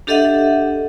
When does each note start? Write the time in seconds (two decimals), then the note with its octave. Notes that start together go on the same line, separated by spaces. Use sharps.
0.07 D4 G4 A4 D#5 E5 F#5